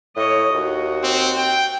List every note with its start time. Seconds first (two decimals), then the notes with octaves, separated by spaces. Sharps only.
0.16 A2 C#5 D#5
0.54 D#2 F#4
1.03 C4
1.37 G5